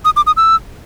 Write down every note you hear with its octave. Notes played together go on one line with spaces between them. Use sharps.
D#6
D6
D#6
E6